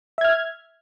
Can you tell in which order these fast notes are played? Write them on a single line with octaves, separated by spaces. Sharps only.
E5 G#6 F6